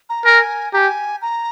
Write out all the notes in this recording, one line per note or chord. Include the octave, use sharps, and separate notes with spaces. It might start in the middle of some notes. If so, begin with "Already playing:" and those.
A#5
A#4 G#5
G4 G#5 A#5
A#5